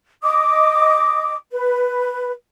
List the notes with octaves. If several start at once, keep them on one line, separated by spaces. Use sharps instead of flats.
D#5 D6 D#6
B4